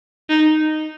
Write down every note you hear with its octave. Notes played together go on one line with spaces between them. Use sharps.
D#4